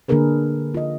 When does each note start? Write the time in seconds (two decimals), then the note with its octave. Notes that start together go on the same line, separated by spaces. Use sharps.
0.08 D3 A#3 D4 G#4 A#4 B4
0.74 F4 D#5